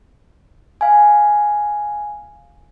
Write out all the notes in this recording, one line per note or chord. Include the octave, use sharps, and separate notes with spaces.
F5 G#5